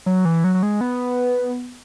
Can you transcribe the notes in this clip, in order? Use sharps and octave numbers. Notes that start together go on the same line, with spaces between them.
F#3
E3
F#3
F#3
G#3
B3